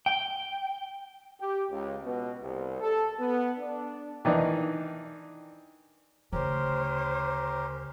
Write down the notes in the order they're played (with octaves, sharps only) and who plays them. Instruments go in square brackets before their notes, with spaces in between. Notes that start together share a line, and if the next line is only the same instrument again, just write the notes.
[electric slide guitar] G5
[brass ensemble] G4
C#2
B2
C2
A4
B3
D4
[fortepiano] D#3 E3 D4 D#4
[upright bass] D2 C#3 [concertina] C#4 G4 A#4 [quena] C5